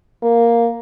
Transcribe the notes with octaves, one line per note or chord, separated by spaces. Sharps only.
A#3